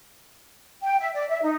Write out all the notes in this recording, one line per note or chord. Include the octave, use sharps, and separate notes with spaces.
G5
E5
D5
E5
D#4